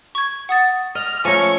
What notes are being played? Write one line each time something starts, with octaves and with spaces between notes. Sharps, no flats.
C#6 G#6
F#5 D#6 A6
D#5 F6
F3 A3 C#4 G#5 A#5 C#6 A#6